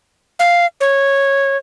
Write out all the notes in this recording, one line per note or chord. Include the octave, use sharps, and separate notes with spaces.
F5
C#5